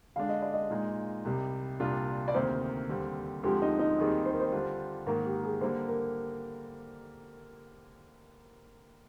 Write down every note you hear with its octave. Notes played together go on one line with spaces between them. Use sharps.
D3 G#3 D4 F5
D#5
D5
D#5
A#2 G#3 D#4
C2 C3 G3
C2 A#2 G3 D4 F4
D5
D2 C3 D#3 A#3 C5
D#2 D3 G3 C4
D2 D3 F3 G#3 C4 G4
D#4
D#4
D#2 D#3 G3 C4 G#4
C5
A#4
C5
D3 G3 D4 F4
G#2 D#3 A#3 A#4
G4
G#4
D3 G3 A#3 C5
A#4